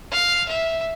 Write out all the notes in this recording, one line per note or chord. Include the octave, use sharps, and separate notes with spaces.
F5
E5